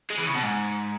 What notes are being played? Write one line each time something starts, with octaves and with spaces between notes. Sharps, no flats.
G#3
E3
C#3
B2
G#2